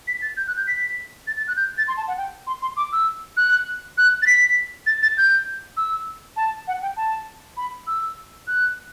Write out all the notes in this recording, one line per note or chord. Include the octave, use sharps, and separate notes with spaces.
B6
A6
G6
F#6
G6
B6
A6
A6
F#6
G6
A6
C6
A5
F#5
G5
C6
C6
D6
E6
F#6
F#6
A6
B6
A6
A6
G6
E6
A5
F#5
G5
A5
B5
E6
F#6